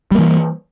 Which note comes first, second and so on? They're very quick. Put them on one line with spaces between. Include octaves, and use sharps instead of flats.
G3 A#3 E3